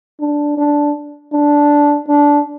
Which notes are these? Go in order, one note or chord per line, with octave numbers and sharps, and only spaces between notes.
D4
D4
D4
D4